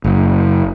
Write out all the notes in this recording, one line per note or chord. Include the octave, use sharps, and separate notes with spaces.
F#1